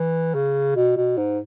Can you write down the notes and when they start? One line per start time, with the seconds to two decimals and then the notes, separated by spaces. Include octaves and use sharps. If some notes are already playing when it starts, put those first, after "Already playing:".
Already playing: E3
0.35 C#3
0.75 B2
0.97 B2
1.17 G#2